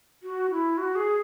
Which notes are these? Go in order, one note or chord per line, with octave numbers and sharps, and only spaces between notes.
F#4
E4
F#4
G#4